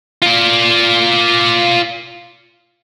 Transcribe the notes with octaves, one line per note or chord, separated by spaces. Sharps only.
F4 D5